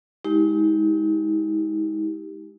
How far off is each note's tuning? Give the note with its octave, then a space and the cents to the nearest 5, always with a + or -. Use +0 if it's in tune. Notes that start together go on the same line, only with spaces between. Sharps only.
G#3 +0 D#4 +40 G4 +0